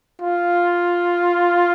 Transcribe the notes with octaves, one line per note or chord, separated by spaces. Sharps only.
F4